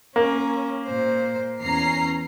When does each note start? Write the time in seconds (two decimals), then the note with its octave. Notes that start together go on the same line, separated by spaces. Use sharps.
0.16 A#3 C#4
0.86 A#2 C5
1.61 E2 C#4 A#5 C7